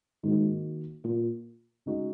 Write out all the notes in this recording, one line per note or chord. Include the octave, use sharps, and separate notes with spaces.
G#2 D#3 A#3 F#4
A#2
C#3 G#3 D#4 F#4